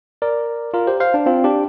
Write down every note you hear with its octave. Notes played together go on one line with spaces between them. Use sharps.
A#4 D5
F4 A#4
G4 C5
C5 F5
D4
C4 F4
D4 G4